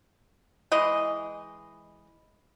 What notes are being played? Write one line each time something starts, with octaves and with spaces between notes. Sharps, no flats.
E3 G#3 D#5